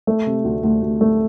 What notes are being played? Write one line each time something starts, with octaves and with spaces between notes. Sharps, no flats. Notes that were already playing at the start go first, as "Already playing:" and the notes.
A3
C3
D2
D2
D2
A3